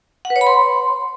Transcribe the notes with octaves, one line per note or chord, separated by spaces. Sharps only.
F#5
B4
C#5
B5
C6